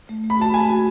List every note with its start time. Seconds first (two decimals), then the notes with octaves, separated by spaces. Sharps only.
0.09 A3
0.24 A3
0.30 B5
0.39 F#4 A5
0.54 A3 G#5
0.69 F#4